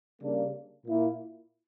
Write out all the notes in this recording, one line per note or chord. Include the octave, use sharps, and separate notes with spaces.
C#3 G3 A#3 D4
A#2 A#3 E4